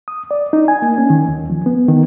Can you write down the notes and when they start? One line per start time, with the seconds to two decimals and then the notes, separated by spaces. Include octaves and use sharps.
0.08 D#6
0.31 D5
0.53 D#4
0.68 G#5
0.82 A#3
0.98 C#4
1.10 D#3
1.28 D#2
1.50 F3
1.66 B3
1.89 D#3